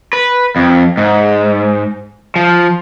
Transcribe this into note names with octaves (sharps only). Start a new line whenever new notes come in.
B4
F2
G#2
F3